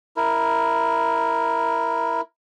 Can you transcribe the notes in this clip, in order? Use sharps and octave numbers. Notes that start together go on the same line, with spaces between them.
E4 A#4